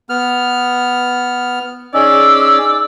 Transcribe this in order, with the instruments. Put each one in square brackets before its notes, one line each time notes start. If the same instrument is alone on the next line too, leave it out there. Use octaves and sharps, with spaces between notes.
[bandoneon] B3 F6
[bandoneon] C#4 [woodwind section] D#4 G#4 D5 [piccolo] E6